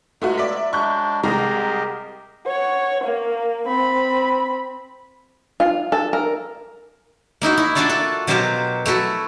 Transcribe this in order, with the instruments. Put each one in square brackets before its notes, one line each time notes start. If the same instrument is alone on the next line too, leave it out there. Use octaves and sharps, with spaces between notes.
[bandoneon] F#3 G#3 B3 [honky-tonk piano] A3 F4 F#4
[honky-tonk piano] D5 E5 B6
[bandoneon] F#3 G#3 D4 [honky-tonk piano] C#6 F#6 G6
[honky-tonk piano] C2 G#3 A#5 [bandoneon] G4 A#4 D#5
[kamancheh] C#5 F#5
A#3
C4 B5
[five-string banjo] F4
A4
A#4
[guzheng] A#3 D#4 E4 F#4
E4
A#3 D4 F4 F#4 A4 D5
A4
B2 F#3 G4 A#4 C5 F5
A3 E4 F#4 A4